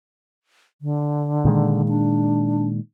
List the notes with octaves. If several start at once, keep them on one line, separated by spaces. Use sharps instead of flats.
D3
A#2 D#3 G#3
D4